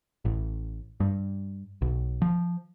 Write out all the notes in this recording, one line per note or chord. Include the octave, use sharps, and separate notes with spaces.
A1
G2
B1
F3